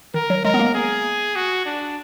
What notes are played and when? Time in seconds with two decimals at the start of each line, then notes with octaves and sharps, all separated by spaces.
0.14 D#3 A#4
0.30 F#3
0.45 G#3 A#4
0.54 B3
0.59 A#3
0.75 G#4
1.35 F#4
1.66 D4